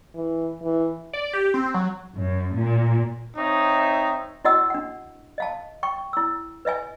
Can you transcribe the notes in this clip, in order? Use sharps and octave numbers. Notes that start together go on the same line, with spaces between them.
E3
E3
D5
G4
C4
F#3
F#2
A#2
C4 D#4 C#5 E5
E4 F#4 D#5 F#5 E6
D4 F#5
D#5 F5 A5
G5 C#6
E4 E6
B4 D#5 E5 G#5